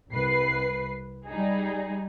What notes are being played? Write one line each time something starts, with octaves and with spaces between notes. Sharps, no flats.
C2 B4 C7
G3 D#4 G#4